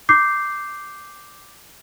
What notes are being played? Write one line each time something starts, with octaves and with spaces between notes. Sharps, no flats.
D6 G6 C7